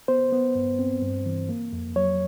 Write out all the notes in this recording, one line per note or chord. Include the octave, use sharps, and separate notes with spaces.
B3 C5
B3
G2
C4
G2
E3
A#3
F2
F#3 C#5